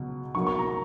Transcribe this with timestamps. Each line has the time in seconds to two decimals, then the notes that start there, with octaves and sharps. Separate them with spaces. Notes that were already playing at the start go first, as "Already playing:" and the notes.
Already playing: C#2 B2 F#3
0.35 B1 B2 F#3 A#3 C#6
0.47 C#6
0.59 A#5